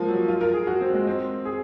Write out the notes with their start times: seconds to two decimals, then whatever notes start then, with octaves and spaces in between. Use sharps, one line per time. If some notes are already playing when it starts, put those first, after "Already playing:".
Already playing: F3 G#3 A#3
0.08 F#3
0.28 F4
0.41 A#4
0.54 G#4
0.67 F#4
0.81 C4
0.94 G#3
1.07 C4
1.45 G#4